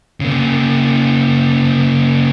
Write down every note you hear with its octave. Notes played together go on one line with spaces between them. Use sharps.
C#3 A#3